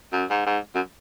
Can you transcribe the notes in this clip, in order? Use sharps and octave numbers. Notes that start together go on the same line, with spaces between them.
F#2
G#2
G#2
F#2